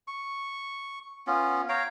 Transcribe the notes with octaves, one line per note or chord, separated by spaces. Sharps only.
C#6
B3 C#4 F4
C#5 F5 G5 A#5